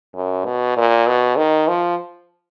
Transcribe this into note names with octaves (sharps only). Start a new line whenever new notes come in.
F#2
B2
A#2
B2
D#3
F3